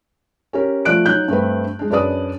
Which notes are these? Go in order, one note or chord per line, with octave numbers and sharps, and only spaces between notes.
C#4 G4 A#4
F3 A3 D5 F#6 D7
F#3 D#4 F#6 G6
G2 A3 C4 B4
G#3 D4
F#2 D4 G#4 B4 D5 D#6